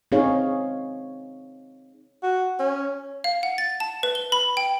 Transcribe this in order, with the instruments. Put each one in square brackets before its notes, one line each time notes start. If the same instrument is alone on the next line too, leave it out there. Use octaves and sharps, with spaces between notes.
[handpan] C4 D#4 G#4 C#5 F5
[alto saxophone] F#4
C#4
[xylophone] F5
F#5
A6
A5
B4
G7
B5
G5